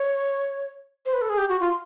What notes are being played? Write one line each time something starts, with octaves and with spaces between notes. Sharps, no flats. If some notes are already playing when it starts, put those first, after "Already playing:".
Already playing: C#5
C5
B4
A4
G#4
G4
F#4
F4